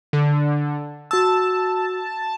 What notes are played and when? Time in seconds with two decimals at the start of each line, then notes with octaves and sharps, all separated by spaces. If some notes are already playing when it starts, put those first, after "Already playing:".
0.13 D3
1.11 F#4 A5 E6